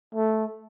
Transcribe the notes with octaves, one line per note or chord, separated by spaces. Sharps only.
A3